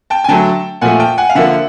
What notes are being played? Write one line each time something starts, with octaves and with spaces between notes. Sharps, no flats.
G5 A5
G#5
D3 F#3 A3 G5 A5
A#2 F3 A3 F#5 G#5
G5 A5
F#5 G#5
F5
D3 F3 A#3 E5 F#5